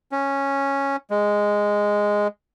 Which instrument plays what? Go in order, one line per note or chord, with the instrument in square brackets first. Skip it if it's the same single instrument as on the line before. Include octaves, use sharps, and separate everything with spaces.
[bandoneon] C#4
G#3